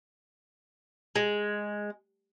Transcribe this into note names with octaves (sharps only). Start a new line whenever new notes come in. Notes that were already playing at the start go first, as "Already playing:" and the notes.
G#3